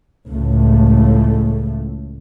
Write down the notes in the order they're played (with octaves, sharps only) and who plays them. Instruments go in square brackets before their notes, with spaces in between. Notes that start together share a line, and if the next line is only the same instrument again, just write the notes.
[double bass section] C#2 A2 A3